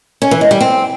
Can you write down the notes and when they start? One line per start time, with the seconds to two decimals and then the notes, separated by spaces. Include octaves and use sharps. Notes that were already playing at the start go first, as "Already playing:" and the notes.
0.22 C#4
0.31 E3
0.41 G#3
0.51 G3
0.61 C4